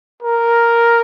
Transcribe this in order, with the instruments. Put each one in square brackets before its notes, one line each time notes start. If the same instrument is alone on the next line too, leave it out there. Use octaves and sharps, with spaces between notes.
[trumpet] A#4